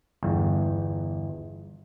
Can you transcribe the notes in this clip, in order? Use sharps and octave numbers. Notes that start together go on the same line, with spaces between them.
G1 E2